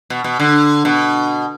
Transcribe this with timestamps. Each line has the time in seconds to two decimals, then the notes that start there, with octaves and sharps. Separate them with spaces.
0.10 B2
0.24 B2
0.39 D3
0.85 B2